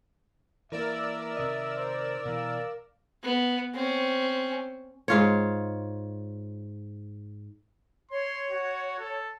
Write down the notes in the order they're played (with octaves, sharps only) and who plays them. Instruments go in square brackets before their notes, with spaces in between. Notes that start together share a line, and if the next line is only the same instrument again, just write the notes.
[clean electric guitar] E3 A#3 [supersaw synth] A#4 D5 E6 [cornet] E5
[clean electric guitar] C3 D#3 D#5
[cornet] C5
[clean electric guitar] B2 E3 [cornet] F5
[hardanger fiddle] B3
C4 C#4
[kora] G#2 F4 C#5
[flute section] C#5 [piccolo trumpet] C6
[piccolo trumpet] F#4
A4